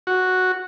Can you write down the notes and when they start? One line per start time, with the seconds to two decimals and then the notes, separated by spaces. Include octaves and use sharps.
0.07 F#4